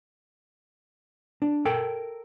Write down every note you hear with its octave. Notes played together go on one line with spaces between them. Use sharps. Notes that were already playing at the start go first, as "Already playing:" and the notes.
D4
A4 A#4 G5